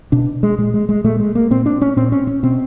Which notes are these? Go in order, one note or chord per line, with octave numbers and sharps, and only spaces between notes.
B2 D4
G#3
A#2 G#3
G#3
G#3
A#2 A3
G#3
A#3
A#2 C4
D4
C#4
A#2 C4
C#4
C#4
B2 C4